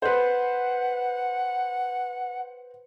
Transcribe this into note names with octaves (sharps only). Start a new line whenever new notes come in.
B4 C5 F#5